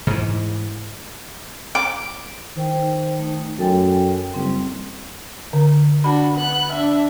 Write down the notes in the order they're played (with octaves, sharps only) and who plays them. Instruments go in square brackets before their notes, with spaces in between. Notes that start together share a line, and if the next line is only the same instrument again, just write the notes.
[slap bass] G#2 E3
[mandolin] D6
[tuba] D#3 [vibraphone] C5 G5
[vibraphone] A3 D#4
[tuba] F#2 [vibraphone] A4 G5 G#5
[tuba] F#1 [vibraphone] G3 C4
[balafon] D3
[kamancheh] D4 F#4 [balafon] B5
[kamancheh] B3 F#6
D4 E5